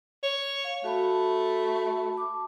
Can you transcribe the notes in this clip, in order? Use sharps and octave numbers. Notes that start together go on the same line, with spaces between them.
C#5
F5
A3 F#4 A5 B5
A5 D6